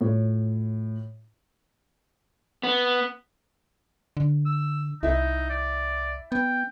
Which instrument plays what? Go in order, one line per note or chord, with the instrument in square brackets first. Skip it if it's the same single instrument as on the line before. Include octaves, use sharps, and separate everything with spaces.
[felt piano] A2 F4 C#5
[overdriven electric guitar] B3
[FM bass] D3
[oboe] E6
[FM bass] C2 [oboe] D#4 [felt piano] E4 E5
[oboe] D5
[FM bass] B3 [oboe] G5